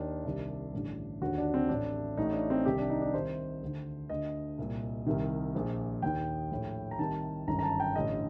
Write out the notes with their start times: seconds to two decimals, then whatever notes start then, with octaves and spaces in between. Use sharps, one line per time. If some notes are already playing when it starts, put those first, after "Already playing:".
Already playing: D#2 D#3 D4
0.24 C2 C3 D#3
0.74 A1 G2 D3
1.22 D#2 D3 F#4
1.38 D4
1.54 C4
1.69 A1 A2 D4
2.17 A1 A2 D#4
2.33 D4
2.50 C4
2.65 C2 C3 D#3 G4
2.78 D4
2.90 D#4
3.02 D4
3.14 C2 C3 D#3 C5
3.62 D2 D3
4.09 D2 D3 D#5
4.58 C2 A#2
5.06 C2 C3 D#3
5.55 A#1 A#2
6.02 D#2 D#3 G5
6.51 A#1 A2
6.91 A#5
6.99 C2 C3 D#3 A5
7.47 G1 F#2 D#3 A#5
7.59 A#5
7.63 A5
7.80 G5
7.96 A1 G2 D3 D#5